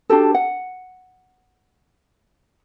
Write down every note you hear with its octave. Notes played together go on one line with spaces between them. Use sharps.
D4 F#4 G4 A4
F#5